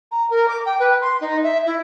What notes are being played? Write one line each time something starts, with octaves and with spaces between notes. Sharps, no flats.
A#5
A#4
D6
G5
B4
C6
D#4
E5
E4